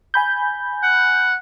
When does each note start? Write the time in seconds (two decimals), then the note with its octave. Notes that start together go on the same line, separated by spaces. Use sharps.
0.14 G#5 B5 G6
0.83 F#5